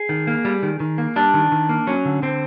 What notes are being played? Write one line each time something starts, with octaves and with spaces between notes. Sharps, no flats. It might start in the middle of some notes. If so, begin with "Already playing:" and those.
Already playing: G#4
D#3
A#3
G3
D#3
D#3
A#3
G3 D4
D#3
D#3
A#3
F#3 C#4
D3
D3 C4